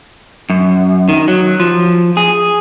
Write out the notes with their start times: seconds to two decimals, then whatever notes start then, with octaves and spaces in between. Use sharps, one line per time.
0.50 F#2
1.09 D#3
1.28 F#3
1.60 F3
2.17 G#4